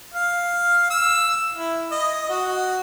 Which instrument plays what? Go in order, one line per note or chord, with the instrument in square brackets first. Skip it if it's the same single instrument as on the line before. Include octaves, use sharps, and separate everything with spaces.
[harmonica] F5
E6
E4
D#5
F#4